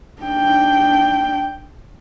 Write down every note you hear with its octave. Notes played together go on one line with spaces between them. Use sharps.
D4 G5